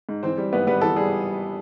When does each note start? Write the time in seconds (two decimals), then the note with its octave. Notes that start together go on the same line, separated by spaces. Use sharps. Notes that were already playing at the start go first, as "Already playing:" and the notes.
0.09 G#2
0.23 E3 C4 C5
0.38 G3
0.53 G#1 B3 B4
0.67 G3 B3 B4
0.81 E3 A4
0.96 G3 G#4